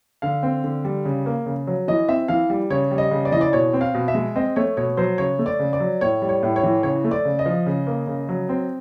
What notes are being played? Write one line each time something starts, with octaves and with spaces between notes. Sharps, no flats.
D3 F5
C4
D3
G3
C#3
A#3
C#3
F#3
E3 D#5
C4 E5
E3 F5
G3
C#3 C#5
G3
D#5
C#3
D5
E3 D#5
D5
B2 C#5
C4
F5
B2
E5
G#3
C4 D#5
A3 C#5
B2 C#5
F#3 C5
C#3 C#5
A3
D5
C#3
D5
F#3
A2 C#5
G3
C#5
A2
C#5
E3
C#3 C#5
A3
D5
C#3
D#5
F3
C#3
A#3
C#3
F#3
C4